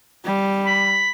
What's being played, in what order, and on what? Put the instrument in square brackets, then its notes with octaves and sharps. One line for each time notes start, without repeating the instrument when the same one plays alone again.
[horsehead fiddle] G3
[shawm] B5